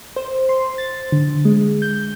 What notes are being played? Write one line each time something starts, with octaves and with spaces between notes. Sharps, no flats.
C5
C6
A6
D3
G#3
G6